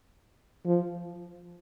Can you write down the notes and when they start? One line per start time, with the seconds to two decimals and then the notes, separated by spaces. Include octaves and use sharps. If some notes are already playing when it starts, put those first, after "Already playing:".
0.66 F3